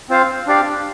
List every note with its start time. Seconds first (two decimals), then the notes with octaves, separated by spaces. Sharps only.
0.09 C4 F4 C5 F5
0.47 D4 G4 D5 F5